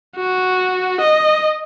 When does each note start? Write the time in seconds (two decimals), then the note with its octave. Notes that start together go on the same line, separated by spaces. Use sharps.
0.16 F#4
1.01 D#5